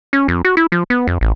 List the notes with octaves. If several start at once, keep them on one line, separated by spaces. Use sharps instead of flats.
C#4
F2
F#4
E4
F3
B3
F2
A1